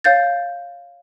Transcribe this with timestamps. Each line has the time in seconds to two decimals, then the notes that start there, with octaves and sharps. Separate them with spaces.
0.04 C#5 F5 G6 A6